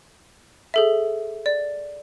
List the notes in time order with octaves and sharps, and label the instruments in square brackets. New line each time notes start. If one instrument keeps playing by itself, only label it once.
[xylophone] G#4 A4 E5
D5